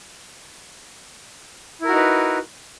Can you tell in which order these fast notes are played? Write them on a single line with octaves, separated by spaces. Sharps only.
E4 A#4 F#4 D#4 B4